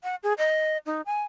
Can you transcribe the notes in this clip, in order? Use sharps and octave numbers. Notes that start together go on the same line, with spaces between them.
F#5
G#4
D#5
D#4
G#5